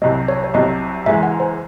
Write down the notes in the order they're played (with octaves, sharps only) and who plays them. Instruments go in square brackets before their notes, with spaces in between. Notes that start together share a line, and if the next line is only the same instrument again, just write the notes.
[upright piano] C2 C3 F#3 [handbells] D#5
[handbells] C#5
C#5
[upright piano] C2 C3 F#3 [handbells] D#5
[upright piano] F#1 F#2 E3 G#3 [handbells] E5
[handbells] F#5
C5